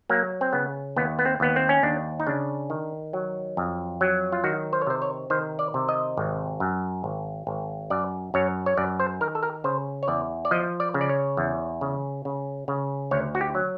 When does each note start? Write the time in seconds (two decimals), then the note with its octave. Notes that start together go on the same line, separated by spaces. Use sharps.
0.10 F#3 A#3
0.41 C4
0.53 C#3 B3
0.96 D#2 B3
1.19 B3
1.25 C4
1.40 D#2 B3
1.56 C4
1.69 C#4
1.83 D#2 D4
2.20 D#4
2.27 C#3 D4
2.70 D#3
3.13 F#3
3.57 F2
4.01 F#3
4.32 F4
4.44 D#3 F#4
4.73 C5
4.82 C#5
4.87 C3 C5
5.02 C#5
5.30 D#3 C5
5.59 D5
5.74 C3
5.89 D#5
6.17 G#1
6.60 F#2
7.04 G#1
7.47 G#1
7.90 F#2 D5
8.34 F#2 C#5
8.66 C#5
8.77 F#2 D5
9.00 C5
9.21 D#3 A#4
9.35 A4
9.43 A#4
9.64 C#3 C5
10.03 C#5
10.08 E2 D5
10.45 D5
10.51 F3 D#5
10.80 D5
10.94 C#3
11.01 D5
11.09 C#5
11.37 E2
11.81 C#3
12.25 C#3
12.68 C#3
13.11 D2 C#5
13.35 F#4
13.41 G4
13.55 F#3